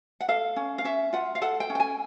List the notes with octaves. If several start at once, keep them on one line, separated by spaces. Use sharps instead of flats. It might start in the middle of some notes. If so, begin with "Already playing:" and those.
F#5
A4 F5
C#4
F5
C#4 E5
F4 F#5
F5
A4 F#5
G5
C#4
G5
G#5